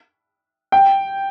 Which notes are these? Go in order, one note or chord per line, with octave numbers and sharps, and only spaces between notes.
G5